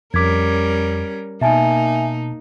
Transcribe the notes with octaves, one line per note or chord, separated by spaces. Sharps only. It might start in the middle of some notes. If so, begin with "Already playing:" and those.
F2 G3 C#4 A#4 D6 G#6 B6
B2 A#3 D#4 E5 G#5 A5